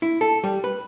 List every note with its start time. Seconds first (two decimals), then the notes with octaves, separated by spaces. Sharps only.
0.02 E4
0.21 A4
0.44 G3
0.64 B4